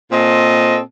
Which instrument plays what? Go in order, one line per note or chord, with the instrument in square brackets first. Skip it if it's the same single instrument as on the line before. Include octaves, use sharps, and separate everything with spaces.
[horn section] A#2 C4 A4 D#5